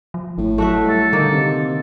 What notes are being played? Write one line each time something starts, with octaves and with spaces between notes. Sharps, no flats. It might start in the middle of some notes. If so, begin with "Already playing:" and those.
F3
G#1 A2
F#3 A3 F#4 E5
G3 A4
D3 D#3 A#3
C3